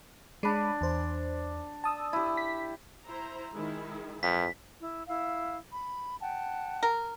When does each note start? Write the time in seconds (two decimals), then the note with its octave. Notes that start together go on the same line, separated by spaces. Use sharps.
0.43 G#3 D4 D5 B5
0.81 E2 C5
1.84 A5 D#6 E6
2.13 E4 G4
2.37 B6
3.06 E4 C5 A#5
3.54 D#3 G#3 E4
4.23 F2 E3 B6
4.81 E4
5.07 E4 F5
5.72 B5
6.20 F#5 G5 A5
6.83 A#4